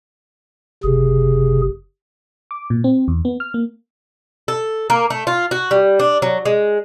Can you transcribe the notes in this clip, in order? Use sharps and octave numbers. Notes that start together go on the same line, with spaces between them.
F#1 C3 G#4
D6
A#2
C4
E2
B3
F6
A#3
A4
A#3
A3
F4
F#4
G3
D4
F#3
G#3